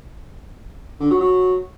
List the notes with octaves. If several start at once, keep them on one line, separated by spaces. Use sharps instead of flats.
D3
F#3
F#3